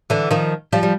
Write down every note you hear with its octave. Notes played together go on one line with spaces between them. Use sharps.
D3 E3
D#3 F3
F3 G3
G3